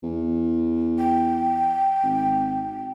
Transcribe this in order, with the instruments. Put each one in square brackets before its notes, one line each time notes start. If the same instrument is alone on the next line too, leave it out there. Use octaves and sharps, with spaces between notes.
[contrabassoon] E2
[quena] G5
[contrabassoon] G#1